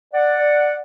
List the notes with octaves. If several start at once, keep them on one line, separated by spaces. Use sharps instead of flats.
D5 F#5